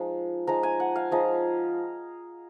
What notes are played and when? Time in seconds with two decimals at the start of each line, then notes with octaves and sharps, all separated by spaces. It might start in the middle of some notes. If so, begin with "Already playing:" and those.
Already playing: F3 G#3 D#4
0.47 F3 G#3 D#4 A#5
0.63 G#5
0.80 F#5
0.96 F5
1.11 F3 G#3 D#4 D#5